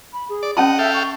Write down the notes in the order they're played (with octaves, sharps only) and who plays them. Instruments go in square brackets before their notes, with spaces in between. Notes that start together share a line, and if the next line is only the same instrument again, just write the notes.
[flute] B5
G#4
[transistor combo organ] D5
[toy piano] C#4 A5 B5 [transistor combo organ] D#5 F#5 [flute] G5
[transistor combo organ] A4 F5 G5 [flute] E5
[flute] C#6